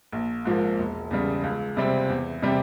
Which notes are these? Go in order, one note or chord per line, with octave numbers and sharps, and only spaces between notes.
A#1
G#2 F3 A#3
E1
E2 C#3 G3
C#2
C3 G3 C4
E2
C3 G3 C4 G4